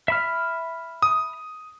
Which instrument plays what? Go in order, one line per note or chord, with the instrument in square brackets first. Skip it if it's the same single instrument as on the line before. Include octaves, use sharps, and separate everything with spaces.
[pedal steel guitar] E5 B5 F6
[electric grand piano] D#6